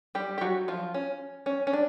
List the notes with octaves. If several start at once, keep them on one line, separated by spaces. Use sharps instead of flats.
G3 G4
G4
F#3 F#4
F3 F4
C#4
C#4
C#4
D4